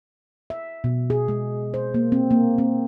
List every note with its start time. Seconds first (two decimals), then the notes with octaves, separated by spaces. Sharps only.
0.50 E5
0.84 B2
1.10 G#4
1.28 G#3
1.74 C5
1.94 A#3
2.12 C4
2.31 A#3
2.58 C4